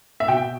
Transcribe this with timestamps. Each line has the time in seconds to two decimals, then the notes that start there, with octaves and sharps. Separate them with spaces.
0.20 E5
0.28 B2 G5